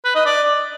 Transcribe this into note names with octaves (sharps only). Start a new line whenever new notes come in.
B4
D#5
D5